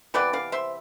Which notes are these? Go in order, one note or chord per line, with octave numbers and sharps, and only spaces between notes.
C3 E3 B3 B4 D5
D5 F5
C5 E5